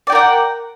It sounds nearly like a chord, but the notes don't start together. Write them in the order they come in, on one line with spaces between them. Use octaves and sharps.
D5 G5 A#4 F#5